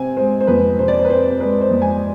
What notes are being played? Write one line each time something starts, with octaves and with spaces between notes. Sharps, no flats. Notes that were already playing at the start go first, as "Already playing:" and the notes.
Already playing: C3 C4 G#5
G#3 C5
C5
F2 B4
C3 C5
D5
C5
B4
C4 C5
G#3 B4
C5
F2
G#5